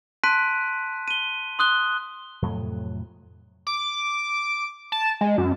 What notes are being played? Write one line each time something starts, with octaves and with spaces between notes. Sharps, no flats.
A5 C6 F#6 B6 D7 D#7
D#7 G7
C6 D#6 F#6 G7
F2 A2 C3 F#3
D6
A5
G#3
F#2